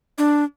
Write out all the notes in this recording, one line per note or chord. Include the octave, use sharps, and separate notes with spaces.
D4